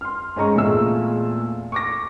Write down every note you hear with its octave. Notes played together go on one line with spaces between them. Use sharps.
C6 F6
G#2 C#4 D#5 A#5 C#6
E2 A#2 A3 G#4 E6
C#6 D6 A#6